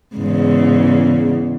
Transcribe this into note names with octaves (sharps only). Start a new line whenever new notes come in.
E2 G#2 C#3